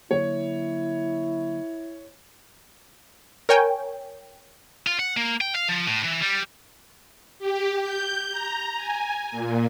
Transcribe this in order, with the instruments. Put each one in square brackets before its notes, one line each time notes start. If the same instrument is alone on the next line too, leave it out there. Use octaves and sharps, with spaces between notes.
[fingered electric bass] D3 F#3 A#3 [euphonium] E4 [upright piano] C#5
[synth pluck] A#4 C#5 G5 G#5
[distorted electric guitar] F4
F#5
A#3
G5
F5
F3
A2
E3
G3
[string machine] G4
G6
A#5
G#5
A#2